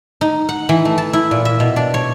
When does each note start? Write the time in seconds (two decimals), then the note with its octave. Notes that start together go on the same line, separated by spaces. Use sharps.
0.21 D#4
0.49 F#5
0.69 E3
0.85 A3
0.98 A5
1.13 E4
1.31 A#2
1.45 E5
1.60 B2
1.76 D4
1.94 C#5